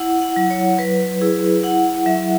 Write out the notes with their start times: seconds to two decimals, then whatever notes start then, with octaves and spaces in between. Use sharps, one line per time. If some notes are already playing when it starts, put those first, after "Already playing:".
Already playing: E4 F#5
0.22 F#5
0.36 F#3
0.51 C#5
0.79 F#3 B4
1.21 E4 G#4
1.63 E4 F#5
2.06 F#3 E5